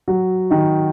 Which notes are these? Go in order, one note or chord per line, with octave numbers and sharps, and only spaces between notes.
F#3 F#4
D#3 D#4